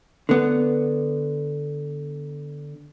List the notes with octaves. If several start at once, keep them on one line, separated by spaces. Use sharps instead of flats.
D3 B3